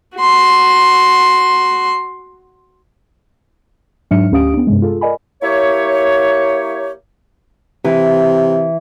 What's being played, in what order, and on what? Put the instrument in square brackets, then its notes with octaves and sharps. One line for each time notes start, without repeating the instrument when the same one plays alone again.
[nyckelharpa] F#4 C6
[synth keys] G#2 F#3 D4 E5 F6 C#7
D2 C#4 G4 F5 D#6 D7
B3 D4
G2 C3 G#3
F4 G#4 A4
A#4 D5 D#5 G#5 B5
[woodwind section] A#3 E4 G4 C#5
[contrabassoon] C3 [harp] E3